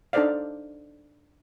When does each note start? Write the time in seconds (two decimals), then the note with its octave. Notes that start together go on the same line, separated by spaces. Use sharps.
0.13 D4 D#4 A4 C5 D5 F5